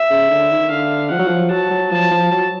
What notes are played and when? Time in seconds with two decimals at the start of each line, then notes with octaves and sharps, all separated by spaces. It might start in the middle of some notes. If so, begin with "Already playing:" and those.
Already playing: E5
0.10 C#3
0.31 D3
0.51 D#3
0.71 D3 F5
1.10 F3 F#5
1.19 F#3
1.27 F3
1.51 F#3 A5
1.71 F#3
1.91 F3 A5
2.11 F3
2.32 F#3